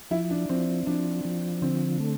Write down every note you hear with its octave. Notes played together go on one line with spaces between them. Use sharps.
F3 E4
D4
F3 C4
F3 D4
F3
D3 C4
A3